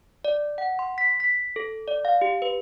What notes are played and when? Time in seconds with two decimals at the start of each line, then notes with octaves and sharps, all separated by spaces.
0.25 D5
0.58 F#5
0.79 C6
0.98 B6
1.20 B6
1.56 A4
1.88 D5
2.05 F5
2.22 G4
2.42 B4